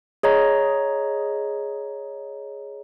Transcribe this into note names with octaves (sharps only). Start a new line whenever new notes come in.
G#4 C#5 D#5 A#5